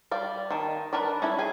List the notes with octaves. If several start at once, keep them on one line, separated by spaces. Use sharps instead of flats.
G3 D5 F5
D#3 A5
D4 A#4 B4 D5
C#4 E4 A4
G#4 G#5